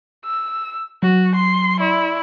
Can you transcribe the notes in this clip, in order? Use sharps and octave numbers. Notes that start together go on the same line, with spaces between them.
E6
F#3 F#4
C6
E4 D5 C6 C#6